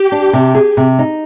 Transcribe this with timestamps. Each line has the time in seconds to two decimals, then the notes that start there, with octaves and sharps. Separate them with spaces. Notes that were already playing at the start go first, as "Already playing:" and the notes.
Already playing: G4
0.12 D4
0.33 C3
0.55 G#4
0.77 C3
0.99 D#4